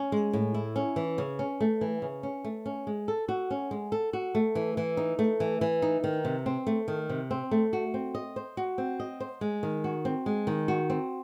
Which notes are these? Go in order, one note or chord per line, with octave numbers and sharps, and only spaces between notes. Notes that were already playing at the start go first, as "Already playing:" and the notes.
Already playing: C#4
G#3
A2
E4
C#4
E3
C#3
C#4
A3
E3
C#3
C#4
A3
C#4
G#3
A4
F#4
C#4
G#3
A4
F#4
A3
E3
E3
D#4
A3
E3
E3
D#4
D#3
C3
C4
A3
D#3
C3
C4
A3
F#4
C4
D#5
C5
F#4
C4
D#5
C5
G#3
D#3
F#4
C4
G#3
D#3
F#4
C4